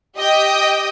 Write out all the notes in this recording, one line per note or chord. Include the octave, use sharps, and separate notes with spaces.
G4 D#5 G5 D#6